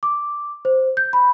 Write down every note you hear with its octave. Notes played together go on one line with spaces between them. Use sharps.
D6
C5
G6
B5